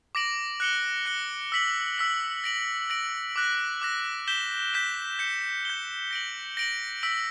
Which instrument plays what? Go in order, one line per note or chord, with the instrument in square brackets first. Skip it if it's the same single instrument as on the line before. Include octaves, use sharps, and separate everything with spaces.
[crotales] D6 A#6 D7 F#7
F#6 C#7 G7
F#6 C#7 G7
E6 B6 F#7
E6 B6 F#7
A#6 D7 F#7
A#6 D7 F#7
D6 F#6 A#6
D6 F#6 A#6
G6 B6 E7 G7
G6 B6 E7 G7
G6 C#7 G7
G6 C#7 G7
A#6 D7 F#7
A#6 D7 F#7
E6 B6 D7 F#7